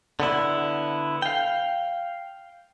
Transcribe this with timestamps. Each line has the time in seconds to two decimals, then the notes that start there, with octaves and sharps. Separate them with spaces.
0.20 D3 B3 E4
1.22 F5 G5